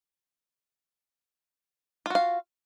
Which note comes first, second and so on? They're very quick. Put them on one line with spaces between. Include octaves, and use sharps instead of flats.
F4 F#4 F5